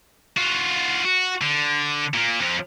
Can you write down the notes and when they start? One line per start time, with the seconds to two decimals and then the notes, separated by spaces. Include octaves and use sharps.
0.37 F4 F#4
1.05 F#4
1.41 D3
2.14 A#2 A#3
2.40 F2 F3